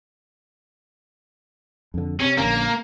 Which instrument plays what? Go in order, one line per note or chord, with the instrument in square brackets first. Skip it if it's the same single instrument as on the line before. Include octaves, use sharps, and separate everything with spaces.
[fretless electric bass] F2 D3
[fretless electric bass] C3 [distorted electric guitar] C#4
[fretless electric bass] A#1 D3 C#4 [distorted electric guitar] A#3